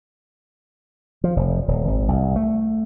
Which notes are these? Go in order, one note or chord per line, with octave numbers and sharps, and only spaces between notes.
F3
F1
D#1
G#1
C2
A3